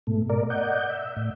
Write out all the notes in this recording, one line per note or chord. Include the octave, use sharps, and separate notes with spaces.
G#2 B2 A3
A#4 D5
D5 D#5 F#5 G6
E5
A2